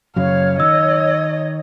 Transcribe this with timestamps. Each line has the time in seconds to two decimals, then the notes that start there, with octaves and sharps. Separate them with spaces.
0.16 F#2 C#3 F#3 C#5 F5
0.60 D#3 D#5 E6